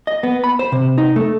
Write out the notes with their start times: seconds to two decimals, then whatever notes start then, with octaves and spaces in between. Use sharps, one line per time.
0.07 D#5
0.23 B3
0.44 B5
0.59 C5
0.72 C3
0.98 D#4
1.16 A3